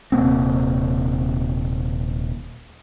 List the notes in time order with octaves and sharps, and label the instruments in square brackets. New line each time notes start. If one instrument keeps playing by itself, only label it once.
[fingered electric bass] D#1 C3 A#3 C4